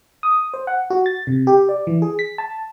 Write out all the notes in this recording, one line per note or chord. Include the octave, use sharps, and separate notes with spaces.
D#6
C5
F#5
F#4
A6
C3
G4
D5
E3
G#4
B6
A5